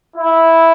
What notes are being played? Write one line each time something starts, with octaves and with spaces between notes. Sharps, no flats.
E4